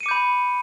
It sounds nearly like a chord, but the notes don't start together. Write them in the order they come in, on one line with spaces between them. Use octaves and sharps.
D#7 C#7 D6 G6 B5